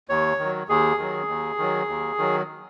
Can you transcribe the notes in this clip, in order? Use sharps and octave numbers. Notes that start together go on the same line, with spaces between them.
D#2 C#5
D#3 F#3
D#2 G#4
D#3 F#3
D#2
D#3 F#3
D#2
D#3 F#3